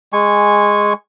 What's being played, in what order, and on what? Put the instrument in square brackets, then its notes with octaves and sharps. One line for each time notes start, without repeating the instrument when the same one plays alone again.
[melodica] G#3 G#5 C#6